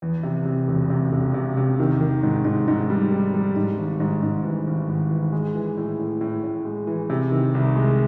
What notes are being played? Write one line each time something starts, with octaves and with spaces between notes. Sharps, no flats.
E2
C3
C3
E1
C3
E1
C3
C3
D#3
D#3
G#2
G#2
G#2
G3
G3
G3
G#2
G#1
G#2
G#2
E3
G#1
G#1
E3
G#3
E3
A2
A2
A2
A2
G#3
E3
C3
D#3
C2
G#3